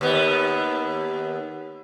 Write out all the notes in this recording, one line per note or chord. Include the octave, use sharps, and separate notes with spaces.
D#2 B3